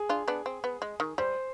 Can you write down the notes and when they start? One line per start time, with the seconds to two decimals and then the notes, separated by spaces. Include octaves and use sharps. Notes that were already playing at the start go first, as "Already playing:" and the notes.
Already playing: G#4
0.09 D4 F4
0.28 B3 D4
0.46 C4
0.64 B3
0.82 G#3
1.00 D#3
1.18 G3 C5